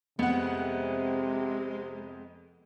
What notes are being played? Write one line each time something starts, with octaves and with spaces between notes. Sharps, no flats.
F2 C3 G#3 B3 F#5